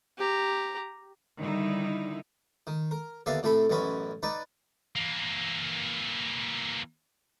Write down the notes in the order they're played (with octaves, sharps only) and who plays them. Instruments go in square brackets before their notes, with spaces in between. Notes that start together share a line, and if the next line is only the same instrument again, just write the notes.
[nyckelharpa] G4 A#5
[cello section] D3 D#3 G3 D#4 E4
[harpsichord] D#3
A#4
D#2 D3 B3 D5 E5 F5
A2 C3 A3 A4 B5
A1 F#2 B3 C#4 B5
D#4 B4 D5
[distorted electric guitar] E3 A#3